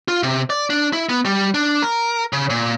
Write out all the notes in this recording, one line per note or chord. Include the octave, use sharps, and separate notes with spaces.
F4
C3
D5
D4
E4
B3
G3
D4
A#4
C#3
A#2